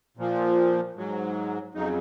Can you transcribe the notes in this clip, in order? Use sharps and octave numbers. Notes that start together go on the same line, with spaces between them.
A#2 F3
G#2 F#3
F2 C#3 F#3 D#4